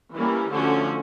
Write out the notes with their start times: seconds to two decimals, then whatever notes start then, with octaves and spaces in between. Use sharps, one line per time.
0.13 E3 G3 A#3 C#4
0.51 D3 F3 A3 C#4 F#4